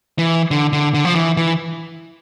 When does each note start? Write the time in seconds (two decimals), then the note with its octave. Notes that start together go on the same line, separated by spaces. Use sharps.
0.19 E3
0.51 D3
0.73 D3
0.94 D3
1.05 F3
1.15 E3
1.37 E3